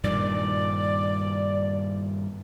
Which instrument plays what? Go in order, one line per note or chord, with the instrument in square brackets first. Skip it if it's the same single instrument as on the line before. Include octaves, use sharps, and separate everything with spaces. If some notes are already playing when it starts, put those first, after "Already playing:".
[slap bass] G2 A#2 D#3 [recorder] D5